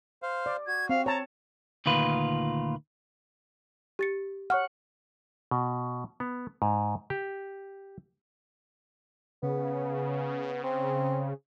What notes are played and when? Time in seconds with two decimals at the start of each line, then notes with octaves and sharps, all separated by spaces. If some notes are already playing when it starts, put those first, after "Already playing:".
0.22 C5 F5
0.46 D5
0.67 F#4 G#6
0.89 C4 F5
1.06 C#5 A5 A#5
1.86 D2 A#2 D#3 F4 B4
3.99 G4 A6 C#7
4.50 C#5 F#5 C#6 F6
5.51 B2
6.20 B3
6.62 G#2
7.10 G4
9.43 C#3 B3
10.63 C4